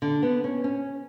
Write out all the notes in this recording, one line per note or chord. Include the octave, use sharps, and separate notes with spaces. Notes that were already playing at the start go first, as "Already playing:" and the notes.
D3
B3
C#4
C#4